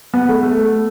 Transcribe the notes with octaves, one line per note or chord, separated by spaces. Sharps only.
B3
A3
A3